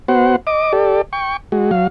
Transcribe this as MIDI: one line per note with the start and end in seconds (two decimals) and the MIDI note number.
0.08 0.36 59
0.08 0.36 66
0.08 0.36 72
0.08 0.36 78
0.47 0.72 75
0.47 0.72 86
0.73 1.02 67
0.73 1.02 69
0.73 1.02 74
1.13 1.37 79
1.13 1.37 85
1.52 1.71 56
1.52 1.71 66
1.71 1.87 54
1.71 1.87 77